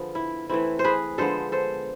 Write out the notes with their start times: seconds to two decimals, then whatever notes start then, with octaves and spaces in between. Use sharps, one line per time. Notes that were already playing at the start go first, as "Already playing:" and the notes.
Already playing: D3 F3 B3 G#4
0.15 E4
0.49 E3 A3 C4 E4
0.79 C5
0.84 G#4 B4
1.18 D3 F3 G#3 B3 A4 C5
1.52 A4 C5